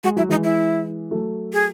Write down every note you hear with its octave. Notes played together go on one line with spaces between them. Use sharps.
G#3 F#4
F#3 E4
E3 G#3 D#4
E4
F#3 A3
G#4